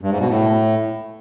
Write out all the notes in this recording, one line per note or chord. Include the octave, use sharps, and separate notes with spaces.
G2
G#2
B2
A2